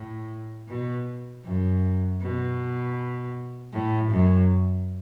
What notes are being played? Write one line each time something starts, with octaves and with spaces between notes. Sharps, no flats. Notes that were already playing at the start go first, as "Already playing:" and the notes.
Already playing: A2
B2
F#2
B2
A2
F#2